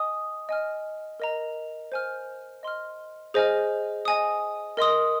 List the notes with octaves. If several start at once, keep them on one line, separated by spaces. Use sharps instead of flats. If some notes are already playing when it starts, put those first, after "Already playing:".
Already playing: D#5 G#5 D#6
D#5 G#5 F6
A#4 D#5 A#5
C5 G#5 F6
D#5 C6 F6
G#4 C5 D#5 G#5 F6
D#5 G#5 D#6
A#4 D#5 C6 D#6